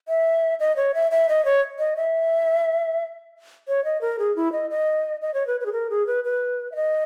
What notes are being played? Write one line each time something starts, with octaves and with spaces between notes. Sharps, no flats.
E5
D#5
C#5
E5
E5
D#5
C#5
D#5
E5
C#5
D#5
A#4
G#4
E4
D#5
D#5
D#5
C#5
B4
B4
G#4
A#4
G#4
B4
B4
E5
D#5